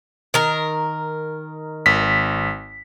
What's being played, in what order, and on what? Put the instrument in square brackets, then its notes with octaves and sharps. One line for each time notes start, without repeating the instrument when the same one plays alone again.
[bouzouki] D#3 A#4
[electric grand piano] G#1 B6